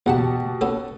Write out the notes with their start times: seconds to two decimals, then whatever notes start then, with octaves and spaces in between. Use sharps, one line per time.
0.06 E2 B2 G4 F#5 A5
0.61 B3 C#4 A4